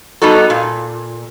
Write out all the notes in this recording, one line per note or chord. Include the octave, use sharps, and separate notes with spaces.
G3 B3 D#4 F#4 A4
A#2